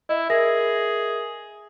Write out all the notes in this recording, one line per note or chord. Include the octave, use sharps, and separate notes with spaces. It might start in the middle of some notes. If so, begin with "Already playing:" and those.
E4 D#5 E5
G#4 A#4 E5 A#6